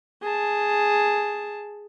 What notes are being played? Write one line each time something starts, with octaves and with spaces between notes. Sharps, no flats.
G#4 A5